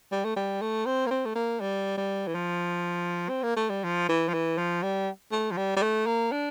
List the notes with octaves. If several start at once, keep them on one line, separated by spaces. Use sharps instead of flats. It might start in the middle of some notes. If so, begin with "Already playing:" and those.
G3
A3
G3
A3
C4
A#3
C4
A3
A#3
G3
G3
E3
F3
C4
A#3
A3
G3
F3
E3
F3
E3
F3
G3
A3
F3
G3
G3
A3
A#3
D4